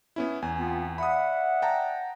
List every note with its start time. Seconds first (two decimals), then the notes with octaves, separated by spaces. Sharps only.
0.16 B3 C#4 E4
0.42 E2 G#5
0.56 B3 C4 F4
0.98 D5 E5 F#5 B5 D#6
1.62 G5 A5 A#5